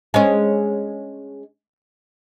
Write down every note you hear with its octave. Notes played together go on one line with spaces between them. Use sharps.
G#3 C#4